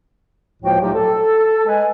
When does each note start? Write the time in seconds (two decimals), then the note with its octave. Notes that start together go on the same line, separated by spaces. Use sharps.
0.62 C#2 A2 F3 A#3 F#4 G5
0.80 A#2 F#3 A3 D#4 F4 G4
0.94 A4
1.67 G#3 B4 G#5